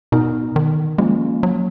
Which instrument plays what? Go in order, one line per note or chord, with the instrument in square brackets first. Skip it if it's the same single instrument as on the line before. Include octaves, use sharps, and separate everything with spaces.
[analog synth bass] B2 [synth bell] B3 D#4 A#4
[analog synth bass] D#3
[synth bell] F3 A#3 C#4 F4 [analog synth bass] G#3
[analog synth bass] F#3